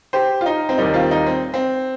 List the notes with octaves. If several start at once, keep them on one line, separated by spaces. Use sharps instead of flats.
G4 C5
F4
D#4
C4
D#2 D#3 G3 D#4
C4 F4
D#4
C4
C4